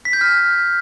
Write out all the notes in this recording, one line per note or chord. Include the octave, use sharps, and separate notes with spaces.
B6
G6
F6